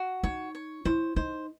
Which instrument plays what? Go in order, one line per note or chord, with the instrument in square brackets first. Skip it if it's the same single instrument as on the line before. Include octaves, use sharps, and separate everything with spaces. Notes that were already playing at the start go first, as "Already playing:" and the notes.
Already playing: [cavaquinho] F#4
[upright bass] D#4 [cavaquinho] C#5
[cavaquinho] C#5
[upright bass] E4 [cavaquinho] C5
[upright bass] D#4 [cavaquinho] C5